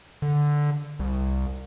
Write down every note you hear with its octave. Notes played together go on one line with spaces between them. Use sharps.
D3
C2